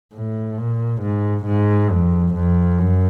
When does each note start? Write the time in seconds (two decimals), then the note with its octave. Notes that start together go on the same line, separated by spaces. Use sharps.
0.14 A2
0.58 A#2
1.02 G#2
1.46 G#2
1.91 F2
2.35 F2
2.79 F#2